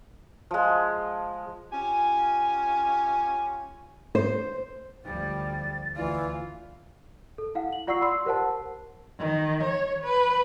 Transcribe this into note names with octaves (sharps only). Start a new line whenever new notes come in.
F3 G#3
C#4 F4 G4 G#5
C5
D2 F3 G3 A6
D2 E3 F4 D5
A4
E4 F5 F#5
F#7
F4 D5 F#5 C#6 E6 C7
B5 C6 E6 C7
G4 A#4 C5 F#5 A5
D#3
C#5
B4